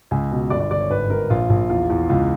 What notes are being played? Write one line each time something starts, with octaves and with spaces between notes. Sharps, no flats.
C#2 G#5
B2
G1 D5
D5
G1 D5
C#5
G#1 B4
G#1 A#4
A#1 F4
A#1
E2 F4
E2
C#2 F4